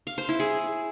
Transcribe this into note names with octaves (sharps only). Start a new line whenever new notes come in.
F5
C5
E4
G#4